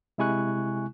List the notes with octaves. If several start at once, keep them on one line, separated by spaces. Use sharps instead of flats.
C3 G#3 E4 G#5 C#6 F#6